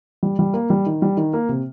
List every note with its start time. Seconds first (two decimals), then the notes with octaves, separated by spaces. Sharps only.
0.23 G3
0.39 G3
0.54 A#3
0.70 G3
0.86 D#3
1.02 G3
1.17 D#3
1.33 A#3
1.49 C3